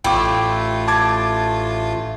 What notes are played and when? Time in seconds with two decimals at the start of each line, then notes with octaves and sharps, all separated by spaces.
0.04 A1 A3 E4 F4 G5 D6
0.88 A5 D6 G#6